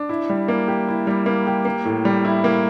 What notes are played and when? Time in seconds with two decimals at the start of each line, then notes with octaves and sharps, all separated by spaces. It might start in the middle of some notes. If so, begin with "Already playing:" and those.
Already playing: D4
0.09 E4
0.30 G3
0.48 A#3
0.68 G4
0.88 E4
1.07 G3
1.26 A#3
1.47 G4
1.65 A#3
1.85 A2
2.05 G3
2.25 E4
2.44 A#3